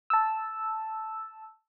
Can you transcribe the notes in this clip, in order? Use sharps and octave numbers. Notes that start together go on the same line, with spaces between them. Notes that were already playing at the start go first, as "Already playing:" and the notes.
A5 E6